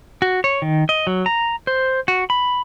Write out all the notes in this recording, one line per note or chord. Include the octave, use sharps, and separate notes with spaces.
F#4
C#5
D#3
D#5
F#3
A#5
C5
F#4
B5